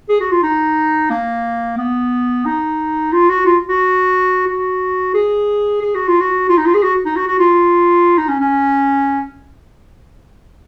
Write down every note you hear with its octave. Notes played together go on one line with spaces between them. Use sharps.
G#4
F#4
F4
D#4
A#3
B3
D#4
F4
F#4
F4
F#4
F#4
G#4
G#4
F#4
F4
F#4
F4
D#4
F4
G#4
F#4
D#4
F#4
F#4
F4
D#4
C#4
C#4